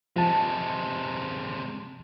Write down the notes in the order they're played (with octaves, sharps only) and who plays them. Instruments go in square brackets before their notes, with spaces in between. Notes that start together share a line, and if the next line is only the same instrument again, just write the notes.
[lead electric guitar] C3 G#3 [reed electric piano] F3 A5